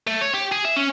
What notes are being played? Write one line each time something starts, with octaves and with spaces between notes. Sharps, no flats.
A3
C#5
G4
G#4
E5
C#4